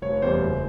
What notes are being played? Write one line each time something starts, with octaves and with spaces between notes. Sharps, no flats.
F1 C#5
E2 B2 G3 C5
F#1